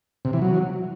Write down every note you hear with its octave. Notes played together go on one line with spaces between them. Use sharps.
C3
E3
F#3